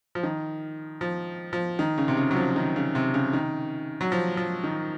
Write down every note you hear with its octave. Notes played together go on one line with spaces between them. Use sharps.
F3
D#3
F3
F3
D#3
C#3
C3
C#3
F#3
F3
D#3
C#3
C3
C#3
D#3
F#3
F3
F3
D#3